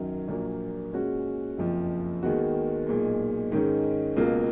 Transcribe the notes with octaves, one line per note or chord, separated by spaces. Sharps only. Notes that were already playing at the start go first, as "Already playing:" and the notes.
Already playing: F#2 D#3 F#3
A#1 A#2 F#3 A#3
A#2 G#3 C#4 F#4
F#1 F2 F3
D#2 D#3 G#3 B3 F#4
B1 A#2 G#3
G#2 D#3 G#3 C#4
C#2 B2 A#3 F4